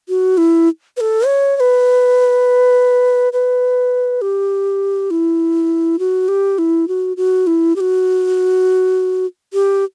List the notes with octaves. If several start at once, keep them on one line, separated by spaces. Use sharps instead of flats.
F#4
E4
B4
A4
C#5
C#5
B4
B4
G4
E4
F#4
G4
E4
F#4
F#4
E4
G4
F#4
G4